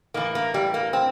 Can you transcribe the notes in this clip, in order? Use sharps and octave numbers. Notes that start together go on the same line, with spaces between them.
A2 E3 A#3
A#3
G3
A#3
C4